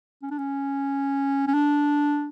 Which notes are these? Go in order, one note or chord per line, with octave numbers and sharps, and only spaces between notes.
C#4
D4
C#4
C#4
D4